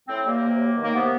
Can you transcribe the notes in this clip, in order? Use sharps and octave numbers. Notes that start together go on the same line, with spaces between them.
A2 C4
G3 A#3
C3
F#3
D#3
A#3
C3 B3